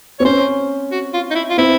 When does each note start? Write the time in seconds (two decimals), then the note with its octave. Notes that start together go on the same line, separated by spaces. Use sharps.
0.20 C4 C#5
0.25 C#4 C5
0.92 F#4
1.14 F4
1.31 D#4
1.35 E4
1.50 F4
1.58 C4 E4